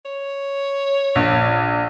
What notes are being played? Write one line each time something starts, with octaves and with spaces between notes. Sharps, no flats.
C#5
A#1